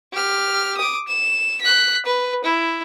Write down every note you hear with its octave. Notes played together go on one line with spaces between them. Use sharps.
G4 F6
D6 D#6
E7
F#6 B6
B4
E4